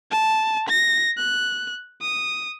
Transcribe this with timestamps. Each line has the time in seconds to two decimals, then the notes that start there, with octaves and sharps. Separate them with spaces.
0.11 A5
0.69 A#6
1.18 F#6
2.01 D#6